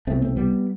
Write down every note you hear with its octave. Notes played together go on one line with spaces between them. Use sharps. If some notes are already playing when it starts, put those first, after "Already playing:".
C2 B2 A3 C4
A3 C4
G3 B3